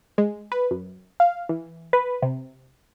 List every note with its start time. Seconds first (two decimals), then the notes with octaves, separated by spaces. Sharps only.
0.18 G#3
0.52 B4
0.71 F#2
1.20 F5
1.49 E3
1.93 B4
2.22 C3